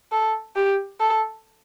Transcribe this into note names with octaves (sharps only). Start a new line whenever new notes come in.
A4
G4
A4